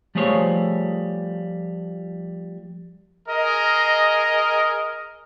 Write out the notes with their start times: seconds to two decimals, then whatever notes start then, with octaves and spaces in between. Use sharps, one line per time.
0.15 F3 G3 A3 G#4 C5 C#5
3.28 G#4 A#4 D#5